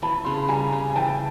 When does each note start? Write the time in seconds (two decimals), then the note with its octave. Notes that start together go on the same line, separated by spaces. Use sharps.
0.02 E3 A5 B5
0.25 C#3 C6
0.37 B5
0.48 G3 G#5 A#5
0.73 C#3
0.90 G#5
0.95 E3 G5 A5